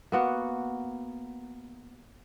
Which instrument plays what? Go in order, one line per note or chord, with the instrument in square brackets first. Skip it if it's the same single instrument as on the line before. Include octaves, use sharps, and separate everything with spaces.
[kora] A#3 B3 F#4